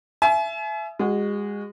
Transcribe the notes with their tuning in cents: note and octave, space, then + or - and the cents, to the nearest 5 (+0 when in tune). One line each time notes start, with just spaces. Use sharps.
E5 +25 G#5 +40
G#3 -25 F#4 +0